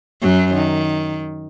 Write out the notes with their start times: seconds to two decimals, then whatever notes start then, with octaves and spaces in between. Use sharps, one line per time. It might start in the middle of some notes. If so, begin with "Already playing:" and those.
0.22 F#2 F#3
0.55 D#3